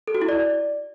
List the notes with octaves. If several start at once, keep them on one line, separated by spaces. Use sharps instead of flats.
A4
F#4
E4
D5